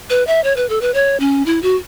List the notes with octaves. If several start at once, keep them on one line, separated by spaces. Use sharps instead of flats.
B4
E5
C#5
B4
A4
B4
C#5
C#4
E4
F#4